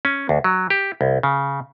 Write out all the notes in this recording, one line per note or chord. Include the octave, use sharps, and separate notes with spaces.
C#4
D2
F#3
G4
C2
C#3